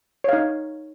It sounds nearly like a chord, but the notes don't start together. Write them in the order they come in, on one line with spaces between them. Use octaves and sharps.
C#5 F5 D#4